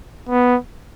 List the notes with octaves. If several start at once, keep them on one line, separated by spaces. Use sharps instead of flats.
B3